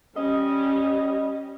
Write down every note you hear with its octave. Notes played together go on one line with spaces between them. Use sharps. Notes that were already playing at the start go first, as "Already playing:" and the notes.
G3 C#4 D#5